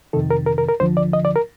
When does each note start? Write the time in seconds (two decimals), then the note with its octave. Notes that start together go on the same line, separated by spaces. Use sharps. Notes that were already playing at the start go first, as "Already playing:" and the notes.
0.13 F2 C3 D#3 A4
0.31 A#4
0.46 A#4
0.58 A#4
0.68 A#4
0.80 D2 D3 F3 C5
0.97 D5
1.13 D#5
1.25 D5
1.36 A#4